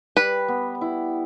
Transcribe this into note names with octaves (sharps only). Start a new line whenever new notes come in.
G3 B4
B3
E4